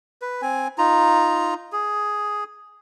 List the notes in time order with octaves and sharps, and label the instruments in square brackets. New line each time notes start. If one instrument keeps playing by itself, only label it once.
[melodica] B4
C4 G#5
D#4 F4 A#5
G#4